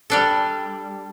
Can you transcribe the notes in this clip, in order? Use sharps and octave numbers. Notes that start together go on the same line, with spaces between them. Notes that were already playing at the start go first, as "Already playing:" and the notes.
G3 D4 A4